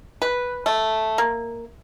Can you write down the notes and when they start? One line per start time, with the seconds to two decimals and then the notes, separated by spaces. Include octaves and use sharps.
0.22 B4
0.66 A3
1.18 A#3